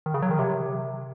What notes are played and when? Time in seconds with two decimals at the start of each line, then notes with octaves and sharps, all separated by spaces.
0.06 D#3
0.14 C#3
0.22 F#3
0.31 D#3
0.39 C3